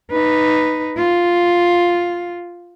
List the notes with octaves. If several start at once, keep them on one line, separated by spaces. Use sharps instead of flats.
D#4 B4
F4